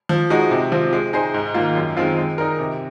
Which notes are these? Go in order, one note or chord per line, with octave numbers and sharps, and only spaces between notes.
F3
G#3 D#4 F#4
C3
F3 C4 F4
G#3
D#4 G#4 C5
G#2
D#3 A#3 F4
F#2
D#3 G#3 C4 F4
G#3
D#4 A#4
C3